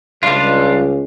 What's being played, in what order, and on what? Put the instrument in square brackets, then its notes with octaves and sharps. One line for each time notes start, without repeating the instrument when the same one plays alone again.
[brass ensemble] C#2 [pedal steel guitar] G3 D4 F4